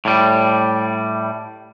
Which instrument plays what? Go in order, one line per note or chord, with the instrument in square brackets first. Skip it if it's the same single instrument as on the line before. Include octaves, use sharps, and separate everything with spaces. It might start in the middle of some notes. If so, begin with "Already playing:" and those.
[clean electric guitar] A2 G3